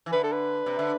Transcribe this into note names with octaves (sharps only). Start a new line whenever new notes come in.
E3
D3 B4
A4
B4
C3
D3